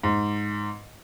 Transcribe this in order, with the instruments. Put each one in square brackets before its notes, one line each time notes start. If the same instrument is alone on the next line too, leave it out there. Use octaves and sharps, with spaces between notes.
[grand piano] G#2